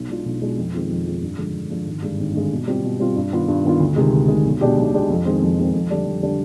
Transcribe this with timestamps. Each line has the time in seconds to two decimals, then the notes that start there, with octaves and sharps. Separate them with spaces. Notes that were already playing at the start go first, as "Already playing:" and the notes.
Already playing: B1
0.09 B2 G#3 D4 F4
0.26 B1
0.41 B2 G#3 D4 F4
0.58 F2
0.74 D#3 G#3 C4 F4
0.90 F2
1.06 D#3 G#3 C4 F4
1.22 G2
1.38 D3 F3 G#3 D4
1.54 G2
1.70 D3 F3 G#3 D4
1.86 G#1
2.02 G2 D3 G#3
2.19 G#1
2.35 G2 D3 G#3
2.51 B2
2.68 G3 C4 F4
2.84 B2
3.00 G3 C4 F4
3.16 G2
3.32 D#3 B3 F4
3.48 G2
3.64 D#3 B3 F4
3.80 D2
3.96 C3 D#3 G#3
4.13 D2
4.28 C3 D#3 G#3
4.45 B1
4.61 B2 G#3 D4 G4
4.77 B1
4.93 B2 G#3 D4 G4
5.10 F2
5.25 D#3 G#3 C4
5.42 F2
5.59 D#3 G#3 C4
5.74 F2
5.91 D3 G3 D4
6.06 F2
6.23 D3 G3 D4